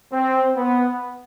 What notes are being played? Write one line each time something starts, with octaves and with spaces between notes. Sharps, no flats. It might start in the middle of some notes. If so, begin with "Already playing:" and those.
C4
B3